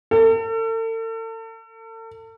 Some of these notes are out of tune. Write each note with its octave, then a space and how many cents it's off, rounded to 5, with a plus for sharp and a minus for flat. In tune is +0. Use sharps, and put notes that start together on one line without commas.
A4 +40